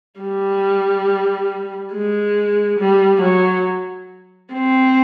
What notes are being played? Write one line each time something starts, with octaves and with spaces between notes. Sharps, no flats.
G3
G#3
G3
F#3
C4